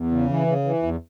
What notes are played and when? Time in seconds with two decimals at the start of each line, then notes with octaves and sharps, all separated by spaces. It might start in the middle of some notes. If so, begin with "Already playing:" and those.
Already playing: E2
0.11 C#3
0.29 E3
0.47 C#3
0.65 E3
0.83 E2